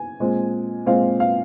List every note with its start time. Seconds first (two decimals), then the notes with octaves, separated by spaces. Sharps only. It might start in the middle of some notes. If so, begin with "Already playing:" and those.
Already playing: G#5
0.20 A#2 G#3 C4
0.86 A#2 G#3 C4 F5
1.20 F5